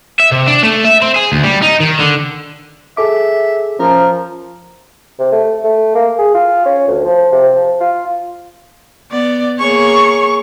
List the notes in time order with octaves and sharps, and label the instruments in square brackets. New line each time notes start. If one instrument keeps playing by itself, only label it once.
[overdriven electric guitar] E5
C3
D4
A3
E5
C4
G#4
D2
G3
D#4
D#3
D3
[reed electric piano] G#4 A4 D6 [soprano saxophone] E5
[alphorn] F3 [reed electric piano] C#4 [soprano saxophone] A#4
[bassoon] C3
A3
A3
A#3
G#4
F4
C#4
D2
F3
C3
F3
F4
[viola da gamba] B3 [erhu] D5
[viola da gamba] A#3 G#4 C#5 [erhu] C#6